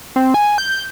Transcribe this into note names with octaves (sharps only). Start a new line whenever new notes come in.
C4
G#5
G6